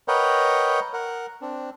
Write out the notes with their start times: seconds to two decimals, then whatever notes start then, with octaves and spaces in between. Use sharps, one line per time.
0.08 A#4 B4 C#5 D#5 F#5 G5
0.93 A#4 F#5
1.41 C4 D4